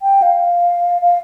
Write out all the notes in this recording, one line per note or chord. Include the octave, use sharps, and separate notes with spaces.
G5
F5
F5